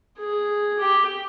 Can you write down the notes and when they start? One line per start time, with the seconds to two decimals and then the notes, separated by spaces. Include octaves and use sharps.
0.18 G#4
0.79 G4